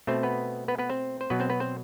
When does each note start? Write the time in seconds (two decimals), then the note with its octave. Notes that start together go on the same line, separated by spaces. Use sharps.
0.07 B2 A3 C4 C5
0.23 B3 B4
0.68 B3 B4
0.78 B3 B4
0.90 C4 C5
1.21 C5
1.30 B2 F#3 B3 B4
1.40 C4 C5
1.50 B3 B4
1.60 C4 C5